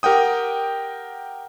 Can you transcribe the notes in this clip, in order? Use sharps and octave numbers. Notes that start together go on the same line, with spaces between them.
G4 A#4 F#5 G5 D#6